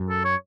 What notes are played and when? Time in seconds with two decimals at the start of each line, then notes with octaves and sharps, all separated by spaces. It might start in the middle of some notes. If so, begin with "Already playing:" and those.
Already playing: F#2
0.10 A4
0.25 C#5